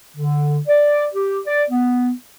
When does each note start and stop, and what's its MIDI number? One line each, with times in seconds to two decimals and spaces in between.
0.17 0.60 50
0.68 1.07 74
1.14 1.40 67
1.47 1.64 74
1.70 2.12 59